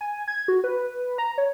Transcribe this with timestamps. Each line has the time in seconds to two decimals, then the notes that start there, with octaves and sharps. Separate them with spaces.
0.01 G#5
0.28 G#6
0.48 F#4
0.64 B4
0.77 B4
1.18 A#5
1.38 C#5